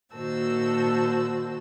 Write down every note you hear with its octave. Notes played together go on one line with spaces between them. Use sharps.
A#2 D#3 F#4 C5 A5 E6